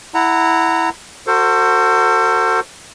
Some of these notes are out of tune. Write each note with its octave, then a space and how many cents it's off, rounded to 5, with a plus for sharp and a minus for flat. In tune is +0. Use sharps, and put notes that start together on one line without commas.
E4 +0 F#5 +0 A#5 -25
F#4 +0 A4 +35 C5 +5